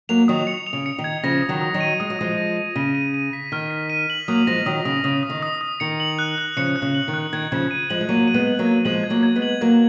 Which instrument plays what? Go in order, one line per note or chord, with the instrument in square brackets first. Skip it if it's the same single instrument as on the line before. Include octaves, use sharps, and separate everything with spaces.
[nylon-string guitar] F#3 A#3 [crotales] F7
[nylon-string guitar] D#3 F#3 [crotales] D#6
[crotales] C#7
F7
[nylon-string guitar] C#3
[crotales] C#7
[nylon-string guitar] D#3
[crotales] G#6
[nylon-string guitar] C#3 F3 [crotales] A#6
[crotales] D#6
[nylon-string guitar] D#3 F#3
[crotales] D#6
[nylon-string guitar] D#3 F#3
[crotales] D#7
[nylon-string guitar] G#3 [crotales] D#6
[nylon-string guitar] F#3
[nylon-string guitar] F3 G#3 [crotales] D#6
[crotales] A#6
D#7
[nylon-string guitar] C#3 [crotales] D#7
[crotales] D#7
D#7
B6
[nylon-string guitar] D#3 [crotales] F6
[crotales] B6
D#7
F#7
[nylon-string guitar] F#3 A#3 [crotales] D#6
[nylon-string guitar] F3 G#3 [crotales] A#6
[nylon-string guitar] D#3 F#3 [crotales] D#6
[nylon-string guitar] C#3 [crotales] D#6
[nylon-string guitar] C#3 [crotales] D#6
[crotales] D#6
[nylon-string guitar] D#3
[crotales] D#6
D#6
[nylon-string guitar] D#3 [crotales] C#7
[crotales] F#7
F#6
F#6
[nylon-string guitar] C#3 F3 [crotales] C#7
[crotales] F#6
[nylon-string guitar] C#3
[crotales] F#7
[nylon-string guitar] D#3
[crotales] F#6
[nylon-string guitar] D#3 [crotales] G#6
[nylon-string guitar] C#3 F3 [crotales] G#6
[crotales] D#7
[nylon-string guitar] F3 G#3 [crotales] F#7
[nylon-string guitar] G#3
[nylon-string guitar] F#3 A#3 [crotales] D#7
[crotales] D#7
[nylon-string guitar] G#3 B3
[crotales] F#7
[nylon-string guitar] F#3 A#3
[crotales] G#6
[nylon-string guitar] F3 G#3 [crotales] F#7
[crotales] G#6
[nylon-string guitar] F#3 A#3
[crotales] G#6
[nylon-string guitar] G#3 B3
[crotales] F#7
[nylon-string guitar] F#3 A#3 [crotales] G#6